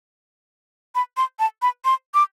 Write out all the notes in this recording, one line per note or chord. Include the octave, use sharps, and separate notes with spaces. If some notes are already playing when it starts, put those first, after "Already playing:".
B5
C6
A5
B5
C6
D6